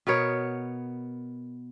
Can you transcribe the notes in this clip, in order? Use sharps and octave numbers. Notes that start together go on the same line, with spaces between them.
B2 B3 A#4 C#5